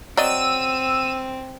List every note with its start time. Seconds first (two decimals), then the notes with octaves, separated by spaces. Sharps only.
0.17 F#3 C4 D5 D#5 E6 D#7